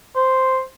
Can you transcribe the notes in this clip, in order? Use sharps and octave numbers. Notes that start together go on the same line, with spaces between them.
C5